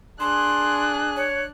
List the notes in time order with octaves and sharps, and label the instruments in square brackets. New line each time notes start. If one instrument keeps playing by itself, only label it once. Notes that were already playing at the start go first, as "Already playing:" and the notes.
[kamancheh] D4 F#6 [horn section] G#4 [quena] C6
[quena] C#5